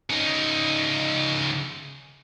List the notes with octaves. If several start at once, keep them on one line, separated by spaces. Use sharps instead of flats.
C#3 D#4